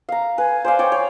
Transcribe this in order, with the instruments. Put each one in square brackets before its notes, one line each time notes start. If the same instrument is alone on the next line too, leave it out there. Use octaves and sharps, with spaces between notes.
[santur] F5 A#5
[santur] B4 [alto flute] G#5
[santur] C5 D5 F5
C#5 D5 G5
C#5